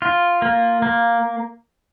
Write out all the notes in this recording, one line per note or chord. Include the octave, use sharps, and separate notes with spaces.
F4
A#3
A#3